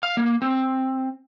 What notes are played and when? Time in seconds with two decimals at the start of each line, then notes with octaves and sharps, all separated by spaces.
0.03 F5
0.17 A#3
0.42 C4